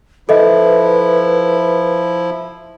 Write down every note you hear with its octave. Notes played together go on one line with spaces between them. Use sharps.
F3 E4 A4 B4 D#5 E5